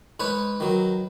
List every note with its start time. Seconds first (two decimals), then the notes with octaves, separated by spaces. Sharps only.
0.20 G#2 B4 C#5
0.60 D#3 F#3